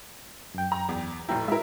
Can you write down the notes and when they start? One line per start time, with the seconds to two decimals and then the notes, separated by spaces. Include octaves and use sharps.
0.54 F#2 G5
0.72 A#5
0.89 E2
1.28 F1 A2 E4 G5 A#5
1.48 G#3 E4 A#4 E5